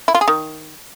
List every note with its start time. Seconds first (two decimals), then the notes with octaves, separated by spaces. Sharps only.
0.08 E4
0.15 F4
0.21 G#4
0.28 D#3